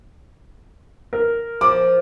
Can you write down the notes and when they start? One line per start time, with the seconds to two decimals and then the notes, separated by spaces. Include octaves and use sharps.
1.13 A#4
1.61 F3 D6